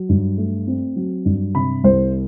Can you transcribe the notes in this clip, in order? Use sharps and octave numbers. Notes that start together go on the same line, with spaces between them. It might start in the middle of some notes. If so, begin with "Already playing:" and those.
Already playing: F#3
G2
A3
C4
F#3
G2
C3 B5
C2 C5